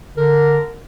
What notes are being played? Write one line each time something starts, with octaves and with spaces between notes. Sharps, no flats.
D3 A#4